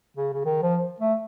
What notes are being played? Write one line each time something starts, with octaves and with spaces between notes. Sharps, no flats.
C#3
C#3
D#3
F3
A3